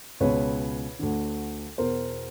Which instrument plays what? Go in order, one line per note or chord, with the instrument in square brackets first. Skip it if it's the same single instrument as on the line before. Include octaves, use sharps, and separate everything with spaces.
[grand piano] C#2 B2 B4 C#5
D2 D3
E2 B2 A#4 C5